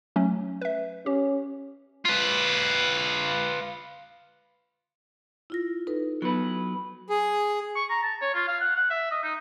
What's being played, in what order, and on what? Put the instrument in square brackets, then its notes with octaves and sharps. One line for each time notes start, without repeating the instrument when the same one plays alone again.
[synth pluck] F#3 A3 C#4
B4 E5
[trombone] C#4 [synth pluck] G4
[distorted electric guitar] F4 B4
[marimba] E4 F4 A#6
D#4 A4 B4
[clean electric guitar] F#3 B4 [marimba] B3
[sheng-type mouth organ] G#4
[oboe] C#6
A#5
A5
C#5
F4
F5
F#5
F#5
E5
D#5
D#4